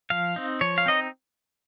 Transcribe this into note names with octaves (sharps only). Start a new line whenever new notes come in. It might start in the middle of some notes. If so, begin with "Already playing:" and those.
F3 F5
C4 D#4
F3 C#5
F5
C4 D#4 D#5